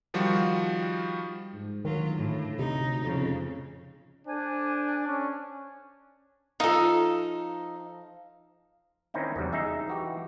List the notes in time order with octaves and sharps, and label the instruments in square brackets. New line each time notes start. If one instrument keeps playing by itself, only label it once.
[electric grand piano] D#3 F3 G3 F4 F#4
[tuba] G#2
[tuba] D2 [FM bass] D#3 [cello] F#3 F4
[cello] A2
[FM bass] C3 [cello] D#4
[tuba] F2 [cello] C#3
[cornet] D4 [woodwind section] A4 C5 G#5
[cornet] C#4
[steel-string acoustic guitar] F3 F5 [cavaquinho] D#4 A4
[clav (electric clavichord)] D#3 C4 C#4 D#4 E4
E2 C#3 F#3 G3
D#4 G#4 E5
E3 F#4 G4